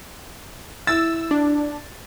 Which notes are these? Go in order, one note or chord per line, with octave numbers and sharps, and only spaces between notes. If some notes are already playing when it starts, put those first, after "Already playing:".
E4 E6 A6
D4